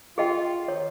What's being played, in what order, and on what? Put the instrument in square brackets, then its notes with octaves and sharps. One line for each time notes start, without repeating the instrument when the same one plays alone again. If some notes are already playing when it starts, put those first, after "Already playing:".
[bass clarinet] F4 [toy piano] G#4 D#5 G5
[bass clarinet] D#3 [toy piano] C#5